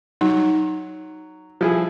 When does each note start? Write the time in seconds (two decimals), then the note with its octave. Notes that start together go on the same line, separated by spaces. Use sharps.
0.21 F#3 D#4
1.61 F3 E4 G#4